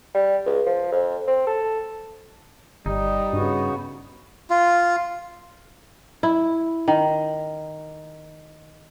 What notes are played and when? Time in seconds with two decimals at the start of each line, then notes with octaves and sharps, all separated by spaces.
0.15 G3
0.46 C#2
0.66 F3
0.92 F2
1.27 C4
1.47 A4
2.86 G1 G3 D#4
3.33 G2 C#3 B3 F#4
4.50 F4
6.23 E4
6.88 D#3